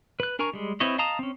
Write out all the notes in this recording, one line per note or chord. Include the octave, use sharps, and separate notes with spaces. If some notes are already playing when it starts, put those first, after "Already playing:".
B4 F#6
D4 A#4 G#5 A#5 C#6
G3 G#3
C4 E4 B4 C#5 D#5
D#5 F5 A5 A#5 D#6
C4 C#4